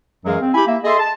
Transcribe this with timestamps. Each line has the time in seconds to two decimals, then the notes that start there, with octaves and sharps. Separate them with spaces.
0.25 F#2 E3 F#3 G#3 G#4 F5
0.41 C4
0.54 E4 G4 G#5 B5
0.67 A#3 E5
0.84 G#4 A4 D#5 E5 C6
1.00 A5